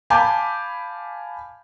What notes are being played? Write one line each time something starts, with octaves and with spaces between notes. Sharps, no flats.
F5 G#5 A5 B5 D6 G6